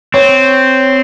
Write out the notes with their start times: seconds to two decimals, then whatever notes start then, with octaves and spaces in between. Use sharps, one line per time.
0.14 C4 C#5